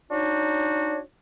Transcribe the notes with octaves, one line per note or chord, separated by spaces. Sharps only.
D4 D#4 F#4 C#5